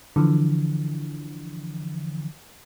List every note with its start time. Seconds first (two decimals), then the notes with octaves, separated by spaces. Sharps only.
0.16 D3 E3 F3